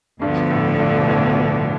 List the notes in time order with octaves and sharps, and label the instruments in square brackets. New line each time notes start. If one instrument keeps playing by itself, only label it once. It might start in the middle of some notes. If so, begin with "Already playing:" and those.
[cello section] D2 D3 F3 B3 [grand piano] G2
[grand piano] A2
G2
B2
A2